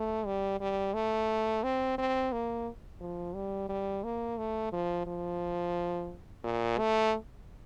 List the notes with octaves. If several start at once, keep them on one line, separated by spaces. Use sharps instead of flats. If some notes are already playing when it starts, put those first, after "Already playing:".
Already playing: A3
G3
G3
A3
C4
C4
A#3
F3
G3
G3
A#3
A3
F3
F3
A#2
A3